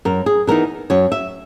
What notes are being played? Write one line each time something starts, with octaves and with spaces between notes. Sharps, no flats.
F#2 A#4
G#4
E3 B3 D#4 A#4
F#2 C#5
E5